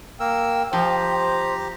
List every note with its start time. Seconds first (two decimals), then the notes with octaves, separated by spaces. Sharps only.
0.20 A#3 A#4 G5 E6
0.73 F3 G4 C5 A#5